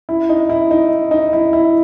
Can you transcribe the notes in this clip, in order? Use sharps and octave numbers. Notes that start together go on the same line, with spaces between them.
E4
D#4
E4
D#4
D#4
E4
E4